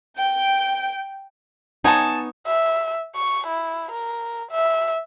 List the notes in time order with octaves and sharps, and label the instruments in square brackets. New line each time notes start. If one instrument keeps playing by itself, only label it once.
[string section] G5
[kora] B3 D#4 C#5 [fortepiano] G#5 A5
[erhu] E5
C#6
E4
A#4
E5